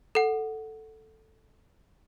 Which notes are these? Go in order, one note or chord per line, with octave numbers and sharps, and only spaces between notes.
A4 F#5